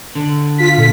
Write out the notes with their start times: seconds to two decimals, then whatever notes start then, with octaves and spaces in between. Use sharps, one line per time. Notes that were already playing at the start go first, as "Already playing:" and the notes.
0.15 D3
0.58 F4 B6
0.77 A#2 A4 B6